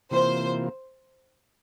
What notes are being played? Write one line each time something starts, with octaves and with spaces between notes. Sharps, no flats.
C3 E3 A#3 F4 C5